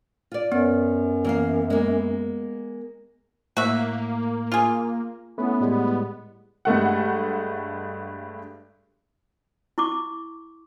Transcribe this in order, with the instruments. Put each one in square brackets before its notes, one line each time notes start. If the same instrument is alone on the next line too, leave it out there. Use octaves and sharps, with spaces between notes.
[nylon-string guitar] F4 D5
[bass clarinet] F#2 [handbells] B3 [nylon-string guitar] C#4
[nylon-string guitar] E3 A#3 F5
G#3 A#3
[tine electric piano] A2 [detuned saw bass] A#3 [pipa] F#4 E5
[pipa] F4 G#4
[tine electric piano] A3 C#4 E4 [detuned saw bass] B3
[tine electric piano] A2 G3 G#3
[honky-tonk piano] G2 G#3 A3 F#5
[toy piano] E4 C#6 D6